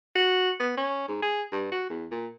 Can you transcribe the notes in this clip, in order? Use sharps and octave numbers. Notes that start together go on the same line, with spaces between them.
F#4
B3
C#4
G#2
G#4
G2
F#4
E2
A#2